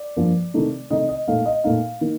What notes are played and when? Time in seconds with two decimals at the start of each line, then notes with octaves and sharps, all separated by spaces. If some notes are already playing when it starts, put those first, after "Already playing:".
Already playing: D5
0.16 G2 F3 A#3
0.54 C3 D#3 A3 D#4
0.90 C3 D#3 A3 D#4 D#5
1.09 D#5
1.28 A#2 A3 D#4 F5
1.46 D#5
1.64 A#2 A3 D#4 F5
2.01 D#3 A#3